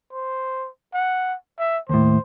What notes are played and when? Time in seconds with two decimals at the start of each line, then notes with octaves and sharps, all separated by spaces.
0.12 C5
0.94 F#5
1.59 E5
1.89 D#2 A2 C5